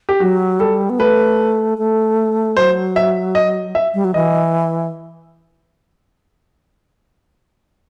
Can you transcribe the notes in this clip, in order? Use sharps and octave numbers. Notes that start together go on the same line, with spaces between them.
G4
F#3 F#4
G3 A4
B3
A3 B4
A3
F#3 C5
E5
D#5
E5
G3
F#3
E3 D#5